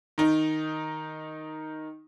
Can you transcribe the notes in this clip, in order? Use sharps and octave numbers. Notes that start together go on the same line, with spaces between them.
D#3 D#4